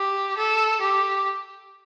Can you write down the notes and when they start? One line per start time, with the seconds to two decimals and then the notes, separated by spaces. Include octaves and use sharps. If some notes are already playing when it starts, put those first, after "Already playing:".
Already playing: G4
0.38 A4
0.81 G4